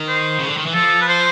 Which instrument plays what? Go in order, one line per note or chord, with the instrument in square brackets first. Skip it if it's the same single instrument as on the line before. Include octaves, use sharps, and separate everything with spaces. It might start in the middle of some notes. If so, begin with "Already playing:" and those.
Already playing: [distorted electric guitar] D#3
[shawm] C5
[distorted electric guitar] C#3
D3
D#3
E3
[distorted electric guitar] F3 [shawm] A4
[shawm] B4
C5